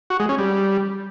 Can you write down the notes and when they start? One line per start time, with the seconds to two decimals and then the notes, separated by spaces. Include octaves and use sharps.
0.10 F#4
0.20 G#3
0.29 C#4
0.38 G3